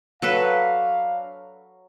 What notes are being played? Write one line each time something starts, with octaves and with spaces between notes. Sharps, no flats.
F#3 D4 A4 B4 F5